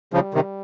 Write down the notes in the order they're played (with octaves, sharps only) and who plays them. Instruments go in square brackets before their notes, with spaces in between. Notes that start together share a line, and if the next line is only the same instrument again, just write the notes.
[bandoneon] C#3 F3 [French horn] G3
[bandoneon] C3 D#3